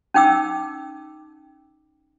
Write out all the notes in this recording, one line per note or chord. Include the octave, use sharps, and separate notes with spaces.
C#4 D#4 G5 D6 E6